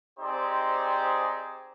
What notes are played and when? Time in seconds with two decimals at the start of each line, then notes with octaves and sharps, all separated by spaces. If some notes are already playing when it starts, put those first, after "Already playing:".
0.20 C4 D#4 G4 G#4 C5 D5